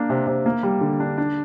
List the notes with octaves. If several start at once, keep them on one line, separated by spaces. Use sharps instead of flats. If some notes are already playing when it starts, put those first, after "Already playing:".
Already playing: A#3 D4
C3
C3
A#3
G3
D3
D4
D4